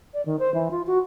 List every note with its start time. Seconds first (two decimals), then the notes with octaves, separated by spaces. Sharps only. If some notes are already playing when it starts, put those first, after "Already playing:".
0.14 D5
0.26 D#3
0.39 C5
0.54 E3
0.71 F4
0.87 F#4